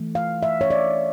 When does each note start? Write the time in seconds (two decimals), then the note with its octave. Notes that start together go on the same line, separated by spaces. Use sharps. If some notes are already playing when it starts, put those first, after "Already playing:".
Already playing: E3 A3
0.15 F5
0.43 E5
0.61 C#5
0.70 D5